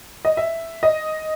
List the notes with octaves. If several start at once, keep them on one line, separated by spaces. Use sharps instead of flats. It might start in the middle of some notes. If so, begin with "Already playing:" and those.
D#5
E5
D#5